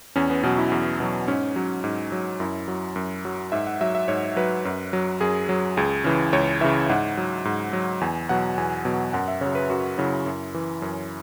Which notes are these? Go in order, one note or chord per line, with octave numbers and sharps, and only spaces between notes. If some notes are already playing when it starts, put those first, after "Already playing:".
E2 C#4
B3
B2 F#3 C#4
E4
E2
B2 F#3
G#2 C#4
F#3
G#2
F#3
F#2 E4
F#3
F#2
F#3
G#2 E5
F#5
F#3 E5
E5
G#2 C#5
F#3 B4
F#2
F#3
F#2 G#4
F#3
C#2 G#4
C#3 E3
C#2 C#5
C#3 E3 E5
G#2 F#5
F#3
G#2
F#3
E2 G#5
B2 F#3 F#5
E2 G#5
B2 F#3
F#2 F#5
E5
C#3 F#3 C#5
B4
F#2 F#4
C#3 F#3 E4
F#2
E3
F#2 C#4